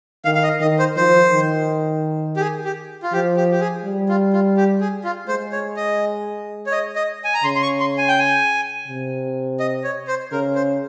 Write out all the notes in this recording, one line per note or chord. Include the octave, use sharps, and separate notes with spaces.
D#3 F5
F5
D#5
D#3 D#5
C5
F3 C5
D#3
G4
G#4
G4
F4
F3 G4
G4
G4
G#4
G3
F4
F4
G4
G#4
F4
G#3 C5
C#5
D#5
C#5
D#5
D#5
G#5
A#5
C#3 C6
C6
C#6
C6
G#5
G5
G#5
C3
D#5
C#5
C5
C#3 A#4
C5